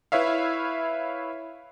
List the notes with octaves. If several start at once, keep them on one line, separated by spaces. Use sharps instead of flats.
E4 B4 C#5 E5 F5